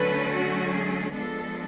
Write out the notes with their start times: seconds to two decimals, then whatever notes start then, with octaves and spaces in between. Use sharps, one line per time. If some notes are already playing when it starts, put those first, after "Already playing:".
Already playing: D3 F#3 A3 C#4 B4
0.35 F#4
0.75 G#4
1.15 F3 G#3 B3 D4 A4